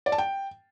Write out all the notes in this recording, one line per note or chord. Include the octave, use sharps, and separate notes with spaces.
D5
A5
G5